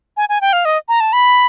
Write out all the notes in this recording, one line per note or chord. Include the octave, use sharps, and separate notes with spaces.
G#5
G#5
G5
F5
D#5
A#5
A5
B5